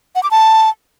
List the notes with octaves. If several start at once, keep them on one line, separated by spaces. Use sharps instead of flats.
F#5
D6
A5